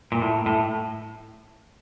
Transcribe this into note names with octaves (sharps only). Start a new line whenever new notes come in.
A#2
A2
A2